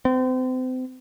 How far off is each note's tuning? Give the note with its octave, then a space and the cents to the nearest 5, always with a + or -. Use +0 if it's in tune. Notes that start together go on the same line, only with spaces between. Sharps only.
C4 -35